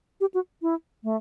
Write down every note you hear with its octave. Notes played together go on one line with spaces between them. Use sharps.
G4
F#4
E4
A3